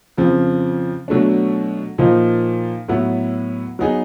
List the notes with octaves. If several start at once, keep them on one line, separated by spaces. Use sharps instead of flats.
F2 C#3 F3
B2 F#3 A3 D4
A#2 F3 A#3 D#4
A2 F#3 B3 E4
F#3 B3 D#4 G#4